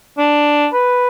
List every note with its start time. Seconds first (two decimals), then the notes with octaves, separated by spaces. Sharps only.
0.18 D4
0.73 B4